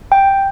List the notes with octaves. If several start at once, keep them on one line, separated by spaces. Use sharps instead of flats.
G5